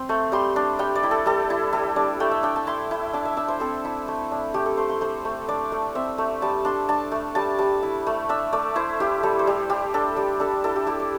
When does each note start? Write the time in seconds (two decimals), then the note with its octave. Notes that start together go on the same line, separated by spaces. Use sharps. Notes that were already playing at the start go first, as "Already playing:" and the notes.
Already playing: C4 C6
0.09 A3
0.32 G3 C6
0.56 D4
0.79 G3 G5
0.95 D5
1.03 E4
1.11 A4
1.26 G3 A4
1.50 E4
1.73 G3 A4
1.96 D4 D5
2.20 A3 G5
2.32 E5
2.43 D4 G5
2.56 A5
2.67 E4 C6
2.91 E4
3.13 D4 A5
3.25 E5
3.37 D4 E5
3.48 C5
3.60 C4 A4
3.85 E4
4.08 A3
4.32 D4
4.54 A3 G4
4.66 A4
4.77 A3 C5
4.89 C6
5.01 A3 C5
5.25 A3
5.48 D4 D5
5.72 A3
5.95 C4 E5
6.18 A3
6.42 G3 A5
6.65 D4 C6
6.89 D4 A5
7.12 A3
7.35 G3 A5
7.59 G3 A5
7.83 E4
8.07 A3
8.29 D4 E5
8.53 A3 D5
8.76 E4 C5
9.00 E4 G4
9.23 G3 A4
9.39 C5
9.47 G3
9.70 G3 G4
9.94 D4 A4
10.16 G3 G4
10.40 D4 A4
10.64 E4 A4
10.76 G4
10.87 E4 G4
11.00 D5